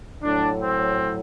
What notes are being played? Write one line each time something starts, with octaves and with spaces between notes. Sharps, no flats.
A2 F#3 D4
C4